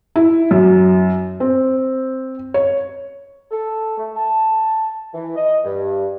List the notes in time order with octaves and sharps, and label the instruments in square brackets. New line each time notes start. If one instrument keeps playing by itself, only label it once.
[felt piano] E4
F#2
C4
C#5
[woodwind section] A4
A3
A5
E3
D#5
G2